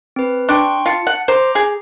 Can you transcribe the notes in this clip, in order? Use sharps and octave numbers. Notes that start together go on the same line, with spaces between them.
C4 B4
D4 G5 C6 C#6
F4 A5 A6 C#7
F#5
C5 A#5 D6 G6
G#4